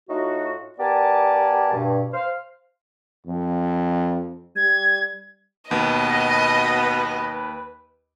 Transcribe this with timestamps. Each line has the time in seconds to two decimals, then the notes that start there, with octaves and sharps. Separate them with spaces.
0.10 A2 D#4 F4 F#4
0.78 B3 G4 A#4 D5 G#5 A5
1.73 G2 B2
2.13 C5 F5
3.27 F2
4.56 G3 G#6
5.71 D#2 B2 B3 B4 D#5